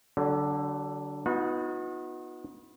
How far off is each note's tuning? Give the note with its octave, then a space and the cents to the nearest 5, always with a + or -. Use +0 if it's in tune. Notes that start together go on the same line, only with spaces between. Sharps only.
D3 +0 F#3 +40
B3 +0 D#4 +20 F#4 -40